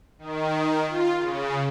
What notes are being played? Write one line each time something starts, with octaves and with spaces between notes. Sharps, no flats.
D#3
F4
C#3